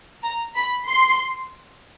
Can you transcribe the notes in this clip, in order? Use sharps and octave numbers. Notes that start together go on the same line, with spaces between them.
A#5
B5
C6